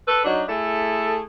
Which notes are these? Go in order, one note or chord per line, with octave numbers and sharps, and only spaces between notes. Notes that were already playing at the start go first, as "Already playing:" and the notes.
A4 B4
F#3 D4 D#4 F#4
A3 E4 G#4 A4